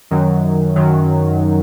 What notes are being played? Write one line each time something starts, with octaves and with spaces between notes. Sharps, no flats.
F#2 D#3 F#3
F#2 D#3 F#3